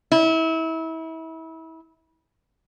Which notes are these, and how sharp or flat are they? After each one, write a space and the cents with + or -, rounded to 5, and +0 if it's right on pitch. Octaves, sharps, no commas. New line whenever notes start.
E4 -30